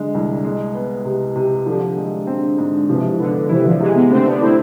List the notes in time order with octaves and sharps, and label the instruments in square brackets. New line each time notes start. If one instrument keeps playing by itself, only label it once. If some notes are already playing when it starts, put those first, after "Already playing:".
Already playing: [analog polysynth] D3 [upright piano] G#3
[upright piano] C2
G#3
B3
C3
C3
[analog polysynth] D3 [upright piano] F3
[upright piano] G#3
C4
G#2
[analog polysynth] C3 E3 [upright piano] F3
[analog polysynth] D3 [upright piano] B3
[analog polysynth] C3 E3 [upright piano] E4
[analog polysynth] D3 F3
[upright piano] C3 [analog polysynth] E3 G#3
[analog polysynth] G#3 B3
[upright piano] D3 [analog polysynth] A3 C4
[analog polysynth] B3 D4
[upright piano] A3 [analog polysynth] C4 E4